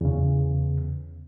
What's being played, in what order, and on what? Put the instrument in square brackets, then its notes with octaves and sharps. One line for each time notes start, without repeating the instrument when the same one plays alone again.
[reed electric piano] E2 C#3